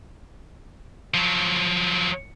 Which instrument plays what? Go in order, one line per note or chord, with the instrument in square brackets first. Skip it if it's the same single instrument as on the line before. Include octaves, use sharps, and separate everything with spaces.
[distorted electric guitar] F3 F#3